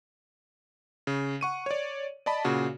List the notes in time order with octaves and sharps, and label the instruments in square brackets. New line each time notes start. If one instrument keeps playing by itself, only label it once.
[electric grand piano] C#3
F#5 C#6 D#7
C#5 D5
D5 D#5 A5 B5
A#2 C#3 F#4